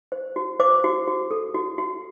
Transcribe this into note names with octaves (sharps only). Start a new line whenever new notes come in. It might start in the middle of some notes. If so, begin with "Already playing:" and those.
C5
F#4
C5 D6
F#4
F#4
A4
F#4
F#4